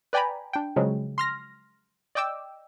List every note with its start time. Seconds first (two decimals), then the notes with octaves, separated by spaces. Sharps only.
0.13 B4 D5 G5 G#5 A#5 B5
0.53 D4 G5
0.76 C#3 F3 F#3 G#3
1.18 C6 F6 A#6
2.15 D5 D#5 G5 D6 E6